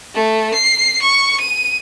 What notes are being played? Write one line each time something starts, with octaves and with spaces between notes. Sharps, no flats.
A3
C7
C#6
D#7